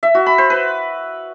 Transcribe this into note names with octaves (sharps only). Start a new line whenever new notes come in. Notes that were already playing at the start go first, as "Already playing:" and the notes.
E5
F#4
B5
C5
B4